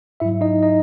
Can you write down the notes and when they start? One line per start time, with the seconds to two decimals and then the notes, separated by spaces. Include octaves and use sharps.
0.20 G#2 F#3 E4 E5
0.41 D#4 D#5
0.62 D#4 D#5